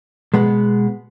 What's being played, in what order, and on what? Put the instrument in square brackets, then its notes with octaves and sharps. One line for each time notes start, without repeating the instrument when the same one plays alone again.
[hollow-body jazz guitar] B2 G#3 B3